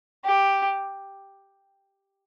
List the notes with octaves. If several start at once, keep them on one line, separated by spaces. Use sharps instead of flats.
G4